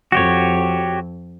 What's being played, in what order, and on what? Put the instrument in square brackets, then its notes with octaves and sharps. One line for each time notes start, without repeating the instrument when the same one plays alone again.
[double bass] F2 [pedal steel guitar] F#4 G4 C#5